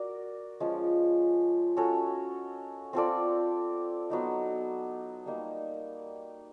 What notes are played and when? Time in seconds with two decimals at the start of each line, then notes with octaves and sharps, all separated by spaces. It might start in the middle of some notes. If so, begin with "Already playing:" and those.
Already playing: F#4 A#4 D5
0.60 F3 G#3 C#4
1.77 C#4 F#4 A4 C#5
2.93 C4 F4 A4 D5
4.10 F#3 B3 D#4
5.26 G3 A#3 D#4